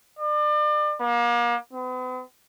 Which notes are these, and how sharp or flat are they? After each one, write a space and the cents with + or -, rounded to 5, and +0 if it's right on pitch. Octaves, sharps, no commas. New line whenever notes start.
D5 +35
A#3 +35
B3 +45